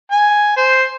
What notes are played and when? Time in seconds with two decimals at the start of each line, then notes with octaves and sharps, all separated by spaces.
0.11 G#5
0.57 C5